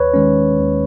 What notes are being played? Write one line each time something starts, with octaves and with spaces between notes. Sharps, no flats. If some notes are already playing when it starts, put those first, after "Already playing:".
Already playing: D#2 B4 C#5
D#3 G#3 C#4
D#2